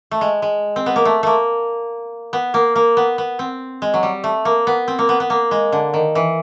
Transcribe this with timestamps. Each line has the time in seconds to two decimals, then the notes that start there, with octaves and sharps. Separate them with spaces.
0.11 A3
0.21 G#3
0.42 G#3
0.76 C4
0.86 B3
0.96 A#3
1.05 A3
1.23 A3 A#3
2.33 B3
2.54 A#3
2.76 A#3
2.97 B3
3.18 B3
3.39 C4
3.82 G#3
3.94 F#3
4.03 G3
4.24 A3
4.45 A#3
4.67 B3
4.88 C4
4.99 A#3
5.09 B3
5.20 B3
5.30 A#3
5.51 G#3
5.72 D3
5.94 D#3
6.15 E3